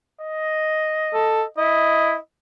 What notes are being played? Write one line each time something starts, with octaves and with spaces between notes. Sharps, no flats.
D#5
A4
E4 D#5